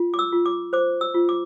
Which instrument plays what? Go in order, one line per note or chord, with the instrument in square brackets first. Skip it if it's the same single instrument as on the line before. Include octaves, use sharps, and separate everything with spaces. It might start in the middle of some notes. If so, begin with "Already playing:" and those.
Already playing: [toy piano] F4
D6
E6
F4
D6
C5 D6
E6
F4
D6